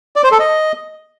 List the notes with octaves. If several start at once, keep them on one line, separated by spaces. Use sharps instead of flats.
D5
C5
A4
D#5